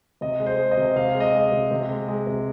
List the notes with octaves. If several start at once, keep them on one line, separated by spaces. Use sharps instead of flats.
C3 D#5
G#3
C5
G#3
D#5
C3
C3 F5
G#3
D#5
G#3
C3
C3
G#3
G#3
C3